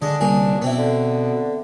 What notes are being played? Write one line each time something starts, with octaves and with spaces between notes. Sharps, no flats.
D3 G#3 D4 D#5
C2 D3 G3 A#3 G#4
B2 B3 C4 E4
D3